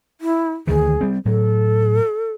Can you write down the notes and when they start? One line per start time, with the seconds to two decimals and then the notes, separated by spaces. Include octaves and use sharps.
0.21 E4
0.67 D2 D#3 E3 G#4
1.01 G3 C4
1.25 A2 F#3 A4